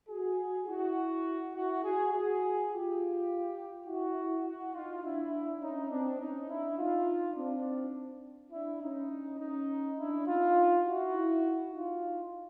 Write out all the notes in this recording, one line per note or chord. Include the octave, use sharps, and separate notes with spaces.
F#4 G#4
E4 F#4
E4 F#4
F#4 G#4
F#4 G#4
F4 G4
E4 F#4
E4 F#4
D#4 F4
D4 E4
C#4 D#4
C4 D4
C#4 D#4
D4 E4
D#4 F4
C4 D4
D4 E4
C#4 D#4
C#4 D#4
D4 E4
D#4 F4
E4 F#4
D#4 F4